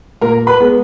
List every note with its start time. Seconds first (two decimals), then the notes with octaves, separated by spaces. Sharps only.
0.22 A#2 A#4 A#5
0.47 B4 B5
0.60 G#3 B3